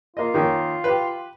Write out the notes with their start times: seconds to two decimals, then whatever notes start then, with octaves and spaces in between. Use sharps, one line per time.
0.17 A#3 F4 D#5
0.34 D#3 A#3 C#4
0.84 G4 B4